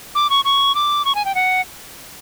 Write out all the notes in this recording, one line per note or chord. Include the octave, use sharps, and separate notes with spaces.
D6
C#6
C#6
D6
C#6
G#5
G5
F#5